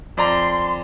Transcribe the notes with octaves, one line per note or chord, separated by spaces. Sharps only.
F2 D5 A#5 C6